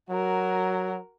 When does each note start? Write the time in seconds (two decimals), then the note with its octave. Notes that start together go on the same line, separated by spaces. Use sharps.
0.11 F#3 F#4 A#4